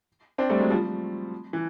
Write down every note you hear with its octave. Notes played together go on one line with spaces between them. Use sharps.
C4 D4
G3 A3
F#3 G#3
F3 G3
E3